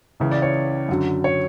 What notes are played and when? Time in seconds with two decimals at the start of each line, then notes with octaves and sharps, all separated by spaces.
0.20 C#2 C#3 E3
0.31 D5
0.42 C#5
0.89 F#2 D3 F#3
1.24 C#5